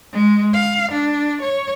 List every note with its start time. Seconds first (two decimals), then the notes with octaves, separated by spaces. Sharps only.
0.13 G#3
0.54 F5
0.92 D4
1.42 C#5